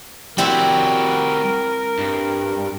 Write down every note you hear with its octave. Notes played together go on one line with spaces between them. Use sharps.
G3 C4 E4 F#4 A#4 E5
G2